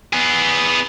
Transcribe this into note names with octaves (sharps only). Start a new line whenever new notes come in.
B3 G#4